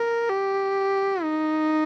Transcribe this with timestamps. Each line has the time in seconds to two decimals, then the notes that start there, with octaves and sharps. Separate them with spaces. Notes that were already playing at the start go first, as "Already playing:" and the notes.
Already playing: A#4
0.29 G4
1.22 D#4